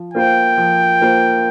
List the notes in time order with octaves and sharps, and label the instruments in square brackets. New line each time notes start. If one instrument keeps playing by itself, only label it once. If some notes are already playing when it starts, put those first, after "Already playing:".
Already playing: [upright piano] F3
[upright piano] A#3 F4 C5 [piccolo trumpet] G5
[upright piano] F3
A#3 F4 C5